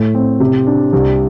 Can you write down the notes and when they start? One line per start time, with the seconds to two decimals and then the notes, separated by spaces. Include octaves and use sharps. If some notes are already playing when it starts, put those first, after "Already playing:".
Already playing: A2 A3
0.15 C4
0.40 C3
0.67 D4
0.93 C2